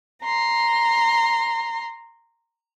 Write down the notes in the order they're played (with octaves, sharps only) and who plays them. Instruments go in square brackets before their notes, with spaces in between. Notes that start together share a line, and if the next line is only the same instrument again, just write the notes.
[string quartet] A#5 C6